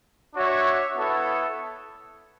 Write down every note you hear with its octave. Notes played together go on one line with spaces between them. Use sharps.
D4 F#4 C#5 E5
B3 E4 A4 C#5